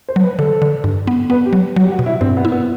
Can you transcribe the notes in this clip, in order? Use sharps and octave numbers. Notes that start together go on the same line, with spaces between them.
C5
F#3
B4
D3 A4
D3
G2
B3
B3 B4
G4
F#3
F#3 F#4
G4
F#4
B2
E4
G2 C4
B3
E4
B3